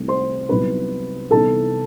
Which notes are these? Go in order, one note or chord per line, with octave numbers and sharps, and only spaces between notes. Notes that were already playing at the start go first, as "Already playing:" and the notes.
Already playing: C2 C3 D#3 A3 C4
C5 C6
C2 C3 F#3 B3 D#4 B4 B5
C2 C3 E3 B3 D#4 A4 A5